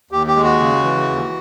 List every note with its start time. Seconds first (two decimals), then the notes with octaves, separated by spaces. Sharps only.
0.11 D#2 G4
0.27 G4
0.36 G#3
0.43 F#4
0.59 C#3
0.84 E3
1.09 D#2